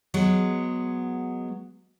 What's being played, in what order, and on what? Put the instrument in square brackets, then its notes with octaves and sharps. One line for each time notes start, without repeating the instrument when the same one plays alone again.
[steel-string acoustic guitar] F#3 G#3 B3